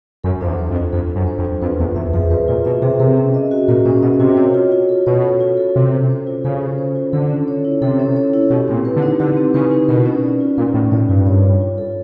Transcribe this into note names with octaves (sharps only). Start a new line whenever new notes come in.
F#2 A4
F2 D4
E2
C5
F2
F4
F2 A4
D4
F#2
C5
F2
F4
F2 B4
E2 F4
E2 E5
F2 G#4
F2 B4
A#2 F4
B2 E5
C3 G#4
C3 A#4
C#4
D#5
F#4
A#2 A#4
A#2 C#4
B2 D#5
C3 F#4
C#5
F4
F4
A4
B2 C#5
F4
F4
A4
C3 A4
C#4
C5
F4
C#3 A4
C#4
C5
F4
D3 A4
C#4
C#5
E4
C3 A4
C#4
C#5
E4
B2 G4
A2 C4
A#2
B4
D3
D#4
D3 G4
C4
C#3 B4
D#4
B2 A#4
C#4
D5
F4
A#2 A#4
A2 C#4
A2 D5
G2 F4
C#5
F4
F4
A4